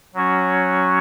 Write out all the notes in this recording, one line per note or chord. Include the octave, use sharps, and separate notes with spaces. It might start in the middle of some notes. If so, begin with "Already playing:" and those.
F#3 C#4 F#4 C#5